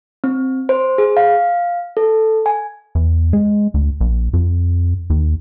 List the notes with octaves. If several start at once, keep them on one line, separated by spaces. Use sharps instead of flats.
C4
C5
G#4
F5
A4
G#5
E2
G#3
D2
A#1
F2
D#2